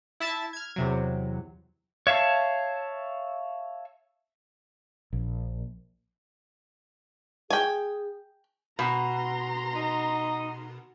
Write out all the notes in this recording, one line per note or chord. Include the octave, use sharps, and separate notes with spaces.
E4 E5 A5 A6
F6 G#6
E2 C3 F#3
C#5 E5 F5 A5
A#1
G#4 G5 G#5
B2 A#5 C6
D#4